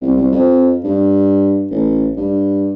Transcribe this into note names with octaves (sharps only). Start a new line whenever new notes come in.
C2
C2
F2
G2
A1
G2